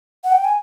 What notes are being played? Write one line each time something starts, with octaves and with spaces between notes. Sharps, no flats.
F#5
G5
G#5